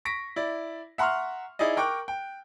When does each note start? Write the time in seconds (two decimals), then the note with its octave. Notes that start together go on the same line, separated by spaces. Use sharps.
0.05 C#6 A#6 B6 D7
0.36 E4 D5
0.98 E5 F#5 A#5 C6 C#6 F6
1.59 D#4 E4 G#4 D5 D#5
1.77 A#4 G5 C#6 D6 F#6
2.08 G5